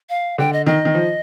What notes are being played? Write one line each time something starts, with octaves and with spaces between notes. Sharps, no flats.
F5
D3 G5
D#5
D#3 D#5
D#3
F3